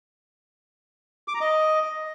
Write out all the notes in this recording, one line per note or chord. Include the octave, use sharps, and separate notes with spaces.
D6
A#5
D#5